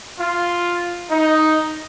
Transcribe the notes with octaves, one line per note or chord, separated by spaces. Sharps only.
F4
D#4